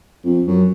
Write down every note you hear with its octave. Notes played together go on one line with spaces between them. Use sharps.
F2
F#2